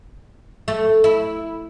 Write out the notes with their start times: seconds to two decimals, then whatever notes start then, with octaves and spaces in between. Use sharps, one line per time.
0.68 A3
1.04 E4